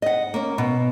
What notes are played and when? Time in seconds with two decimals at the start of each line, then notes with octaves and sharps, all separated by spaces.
0.02 D#5 F#5
0.34 A#3 C#4
0.58 B2